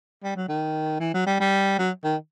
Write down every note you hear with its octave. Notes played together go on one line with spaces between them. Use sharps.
G3
F#3
D#3
E3
F#3
G3
G3
F#3
D#3